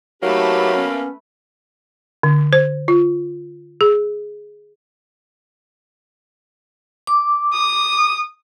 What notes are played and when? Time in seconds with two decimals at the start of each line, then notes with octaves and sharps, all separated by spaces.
0.23 F#3 A3 A#3 C4 D#4 G4 B4 B5
0.75 B3 C#4
2.23 D3
2.53 C5
2.88 F4
3.81 G#4
7.07 D6
7.53 D#6